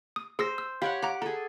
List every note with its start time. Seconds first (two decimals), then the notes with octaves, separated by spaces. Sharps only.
0.16 D#6
0.39 G#4 C5 E6 A#6
0.58 E6
0.82 G4 C#5 F5 F#5 B5
1.02 F5 F#5 A#5 D6
1.22 G#4 A4 A#5